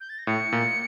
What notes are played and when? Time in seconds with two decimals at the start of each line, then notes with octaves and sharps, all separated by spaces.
0.01 G6
0.09 A6
0.18 A#6
0.27 A2 C#7
0.52 A#2